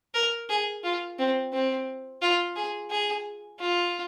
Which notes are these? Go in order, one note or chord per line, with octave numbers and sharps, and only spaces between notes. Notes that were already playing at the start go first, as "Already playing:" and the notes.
A#4
G#4
F4
C4
C4
F4
G#4
G#4
F4